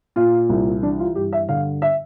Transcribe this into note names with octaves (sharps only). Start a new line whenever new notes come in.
A#2 F4
C2
E3 D4
F4
G2 G4
E5
D3 F5
E5